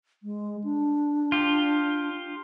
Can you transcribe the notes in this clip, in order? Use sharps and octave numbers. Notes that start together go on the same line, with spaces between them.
G#3
D4
F4 G4